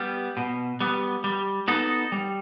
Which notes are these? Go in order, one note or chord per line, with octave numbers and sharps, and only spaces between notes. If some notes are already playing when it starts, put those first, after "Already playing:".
Already playing: G3 B3
B2
G3 B3
G3
B3 D#4 F#4 A4
G3